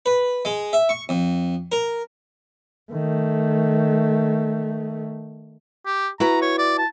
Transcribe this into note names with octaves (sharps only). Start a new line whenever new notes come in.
B4
G#3
E5
C#6
F2
A#4
D#3 A3
G4
E4 F#4 B4 A#5
C#5
D5
A5